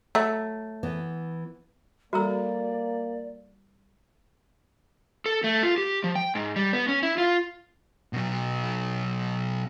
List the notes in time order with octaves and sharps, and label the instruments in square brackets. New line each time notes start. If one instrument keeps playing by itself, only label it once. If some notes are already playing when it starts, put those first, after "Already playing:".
[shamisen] F#3 E5 [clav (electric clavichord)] A3
[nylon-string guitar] E3 B3
[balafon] G3 A4 [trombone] A#3 [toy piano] F#4 A#5 E6 [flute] D5
[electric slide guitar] A4
A3
F4
G4
F3
G5
G#2
G3
B3
C#4
E4
F4
[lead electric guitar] B2 F#3